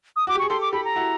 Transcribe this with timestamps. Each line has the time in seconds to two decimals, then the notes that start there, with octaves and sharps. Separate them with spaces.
0.16 D#6
0.27 F#4 D6
0.35 G4
0.39 G#4 C#6
0.50 G4 A4 C6
0.61 D6
0.73 G4 A4 B5
0.85 A#5
0.96 E4 F#4